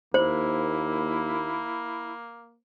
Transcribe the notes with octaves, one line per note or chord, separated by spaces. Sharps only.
D#2 A#3 E4 C5